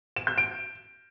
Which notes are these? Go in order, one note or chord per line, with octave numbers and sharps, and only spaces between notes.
E7
G6
D7